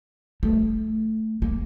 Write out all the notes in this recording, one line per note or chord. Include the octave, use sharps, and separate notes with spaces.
A3
A#3